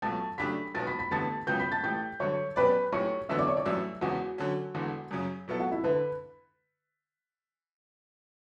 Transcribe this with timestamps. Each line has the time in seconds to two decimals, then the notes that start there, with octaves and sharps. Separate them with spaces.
0.02 C#2 B2 F#3 A3 A5 A6
0.38 C#3 F#3 A3 D4 G4 B5 B6
0.75 B1 B2 F#3 B3 A5 A6
0.87 B5 B6
0.99 B5 B6
1.11 A1 G2 D3 G3 B3 A5 A6
1.47 C#2 C#3 F#3 B3 G5 G6
1.59 B5 B6
1.72 A5 A6
1.84 A1 A2 G3 G5 G6
2.20 G2 D3 F#3 C#5 C#6
2.56 B2 F#3 C#4 G4 B4 D5 B5
2.93 B1 A2 G3 C#5 C#6
3.29 E2 D3 F#3 B3 E5 E6
3.38 D5 D6
3.47 C#5 C#6
3.57 D5 D6
3.65 A1 G2 F#3 C#4 E5 E6
4.01 E1 E2 C#3 F#4 F#5
4.38 D3 F#3 C#4
4.75 E1 E2 D3
5.11 F#2 C#3 F#3
5.48 B2 F#3 B3 E4 A4
5.59 F#4 F#5
5.71 E4 E5
5.84 D3 B4 B5